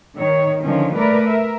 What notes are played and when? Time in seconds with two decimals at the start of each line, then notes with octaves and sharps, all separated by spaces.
0.16 D#3 C#5
0.63 D3 D#3 F3 C#4
0.95 A3 A#4 B4 D5
1.28 A#4 E5